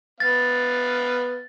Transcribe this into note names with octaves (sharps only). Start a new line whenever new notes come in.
B3 F5 A6